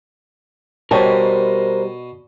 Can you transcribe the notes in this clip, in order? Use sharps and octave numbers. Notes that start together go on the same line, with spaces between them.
B2 G3 A#4 C5 C#5 D#5 G5 A5